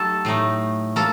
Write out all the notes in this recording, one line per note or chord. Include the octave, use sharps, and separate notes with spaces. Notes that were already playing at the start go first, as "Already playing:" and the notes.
Already playing: F#3 A3 D#4 G4 A4
A2 A3 D#4
A#3 A4